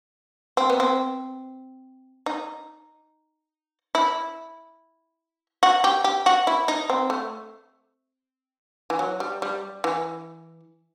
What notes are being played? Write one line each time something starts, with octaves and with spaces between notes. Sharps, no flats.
C4
B3
C4
D#4
E4
F#4
G4
G4
F#4
E4
D#4
C4
A3
E3
F#3
G3
G3
E3